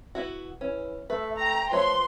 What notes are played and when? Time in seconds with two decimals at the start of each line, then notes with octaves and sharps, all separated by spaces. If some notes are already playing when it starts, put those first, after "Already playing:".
0.15 B3 E4 F#4
0.61 E3 C#4
1.10 A3 B4 E5
1.40 G5 A#5
1.72 F3 A3 B4 C#5 E5 C6